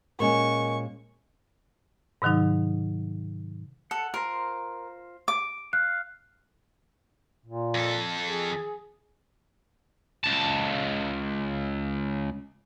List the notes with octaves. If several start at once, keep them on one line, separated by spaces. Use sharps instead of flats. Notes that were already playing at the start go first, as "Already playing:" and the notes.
A#2 G#3 C#4 A#4 D#5 G#5 C#6
G#2 C3 D#3 F#3 D#4
A4 F#5
F4 A#4 C5 A#5
D6
F5 F#6
A#2
F2 A4
G#4
C#2 A5